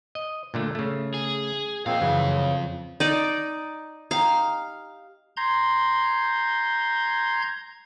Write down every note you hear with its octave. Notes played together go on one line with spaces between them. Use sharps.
D#5
A#2 D3 A3
C#3 A3
G#4
F2 A#2 F3 G#3 C4 F5
F#2 C#3 E3
D#4 D5
D#4 G4 F5
A#5 C6 G6 G#6